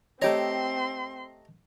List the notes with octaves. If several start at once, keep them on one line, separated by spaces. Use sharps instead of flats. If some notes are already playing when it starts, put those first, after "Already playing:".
A3 C4 G4 C#5 D#5 A#5 C6